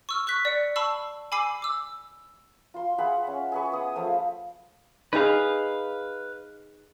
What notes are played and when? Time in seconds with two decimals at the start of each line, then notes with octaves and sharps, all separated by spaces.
0.09 C#6 E6 F6
0.27 C#6 F#6 B6
0.45 D5 C#7
0.76 A5 B5 C#6 E6 C7
1.32 G#5 B5 D6 E6 C7
1.62 D6 E6
2.74 F4 C6
2.98 G#4 E5 F#5 B5
3.27 C#4
3.52 G#4 B4 C#6
3.72 B3 D#6
3.96 F3 A3 F5
5.13 D#4 G#4 B4 F5